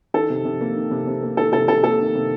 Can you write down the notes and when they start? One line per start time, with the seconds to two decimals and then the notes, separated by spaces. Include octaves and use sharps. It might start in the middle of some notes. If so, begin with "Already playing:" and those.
0.14 D#3 A4
0.30 C3
0.45 C3
0.61 A#3
0.76 D#3
0.91 C3
1.07 C3
1.23 A#3
1.37 D#3 A4
1.53 C3 A4
1.68 C3 A4
1.84 A#3 A4
2.00 D#3
2.15 C3